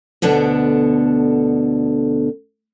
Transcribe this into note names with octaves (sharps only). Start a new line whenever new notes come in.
D2 B2 D3 B3 D4